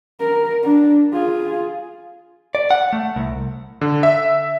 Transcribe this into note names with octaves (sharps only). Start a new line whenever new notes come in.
A#4
D4
F4 G#4
D5
F#5
A3
C2
D3
E5